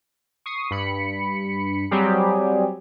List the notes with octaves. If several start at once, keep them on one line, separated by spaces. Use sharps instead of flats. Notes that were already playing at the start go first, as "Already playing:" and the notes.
C#6 D#6 C7
G2 B5 C#7
F#3 G3 C4 G4 G#4